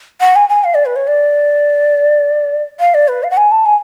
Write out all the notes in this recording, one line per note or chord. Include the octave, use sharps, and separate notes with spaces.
F#5
G#5
G#5
F5
D5
B4
C#5
D5
F5
D5
B4
F5
F#5
G#5
A5
G#5